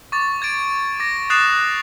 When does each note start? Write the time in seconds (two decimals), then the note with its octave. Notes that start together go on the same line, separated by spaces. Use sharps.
0.12 C#6 D6 A6
0.42 G#6 A6 D7
1.00 D6 A#6
1.30 D#6 F#6 A6 C7 E7 F7
1.48 F#6